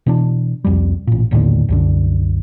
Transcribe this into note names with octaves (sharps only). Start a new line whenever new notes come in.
B2 E3 D4
C2 F2 G3
A1 A#2
A#1 D#2 A2 D3
C2 F#2 D3